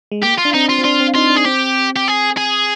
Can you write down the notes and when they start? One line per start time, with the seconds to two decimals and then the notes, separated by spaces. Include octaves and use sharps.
0.12 G#3
0.23 A#3 G4
0.38 F4
0.45 D4
0.54 C4 D#4
0.69 F4
0.79 C4
0.85 D4 F4
1.00 C4
1.15 D#4 F4
1.30 D4
1.37 G#4
1.45 C4 G4
1.96 G4
2.08 G#4
2.37 G#4